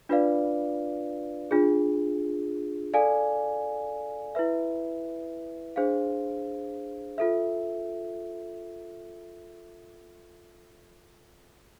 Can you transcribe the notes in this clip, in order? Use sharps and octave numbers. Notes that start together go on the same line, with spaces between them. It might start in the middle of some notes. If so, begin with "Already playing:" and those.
D4 F4 B4 D5 F5
D4 F4 G#4
A4 D5 F5 G#5
E4 B4 E5
D4 G#4 C5 F5
F4 A4 E5